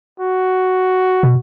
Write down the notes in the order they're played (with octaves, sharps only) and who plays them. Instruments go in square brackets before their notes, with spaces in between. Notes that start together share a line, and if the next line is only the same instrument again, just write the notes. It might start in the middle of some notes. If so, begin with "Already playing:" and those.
[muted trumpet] F#4
[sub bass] B2